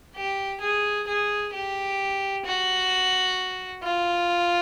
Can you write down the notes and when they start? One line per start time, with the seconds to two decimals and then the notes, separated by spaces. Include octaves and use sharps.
0.16 G4
0.61 G#4
1.07 G#4
1.53 G4
2.45 F#4
3.83 F4